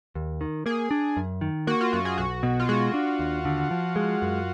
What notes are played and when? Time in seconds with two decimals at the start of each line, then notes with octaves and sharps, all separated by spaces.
0.16 D#2
0.41 D#3
0.66 A#3 G#4
0.91 D4
1.17 F#2
1.41 D#3
1.67 A#3 F#4
1.81 F4
1.93 F#2 F#4
2.05 G#4
2.18 B1 F#4
2.43 B2
2.60 F4
2.69 G#3 F#4
2.94 D4
3.19 D#2
3.45 D3
3.71 F3
3.96 G#3
4.22 F#2